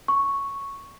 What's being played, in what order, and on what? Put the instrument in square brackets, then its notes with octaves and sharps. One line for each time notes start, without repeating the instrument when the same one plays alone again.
[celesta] C#6